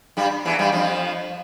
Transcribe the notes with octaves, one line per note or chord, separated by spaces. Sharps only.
G2 G3
E2 E3
G2 G3
F2 F3